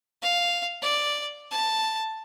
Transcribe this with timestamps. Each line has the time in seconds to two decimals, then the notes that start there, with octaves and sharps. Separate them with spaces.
0.22 F5
0.82 D5
1.51 A5